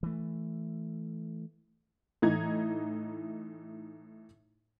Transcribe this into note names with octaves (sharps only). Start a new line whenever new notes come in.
E3 A3
A2 E3 D#4 A#5 G#6